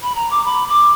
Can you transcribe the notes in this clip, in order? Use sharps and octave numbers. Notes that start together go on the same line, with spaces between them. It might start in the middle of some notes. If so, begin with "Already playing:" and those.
B5
A#5
D6
B5
D6